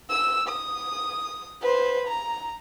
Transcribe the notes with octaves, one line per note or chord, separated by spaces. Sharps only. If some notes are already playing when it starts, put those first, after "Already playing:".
E6
D#6
B4 C5
A#5